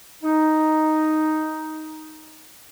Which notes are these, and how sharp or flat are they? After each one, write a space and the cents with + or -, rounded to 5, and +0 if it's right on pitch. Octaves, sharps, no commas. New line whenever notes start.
D#4 +0